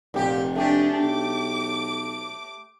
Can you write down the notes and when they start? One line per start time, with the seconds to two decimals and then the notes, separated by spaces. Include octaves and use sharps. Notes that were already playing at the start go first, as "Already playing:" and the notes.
0.14 F1 A#2 G4
0.56 A3 D4 G4 G#4
1.00 B1 D6